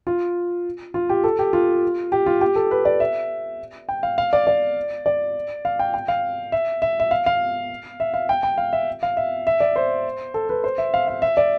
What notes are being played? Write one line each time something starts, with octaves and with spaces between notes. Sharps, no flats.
F4
F4
G4
A4
G4
F4
G4
F4
G4
A4
B4
D5
E5
G5
F5
F5
D5
D5
D5
F5
G5
G5
F5
E5
E5
E5
F5
F5
E5
F5
G5
G5
F5
E5
F5
E5
E5
D5
C5
A4
B4
C5
E5
F5
F5
E5
D5